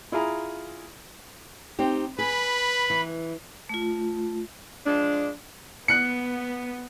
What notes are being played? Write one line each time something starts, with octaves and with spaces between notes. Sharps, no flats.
E4 F4 G#4 A#5
C4 D#4 G4
G#4 B4 B5
E3
A3 F4
F3 G#3 D4
B3 F#6 C#7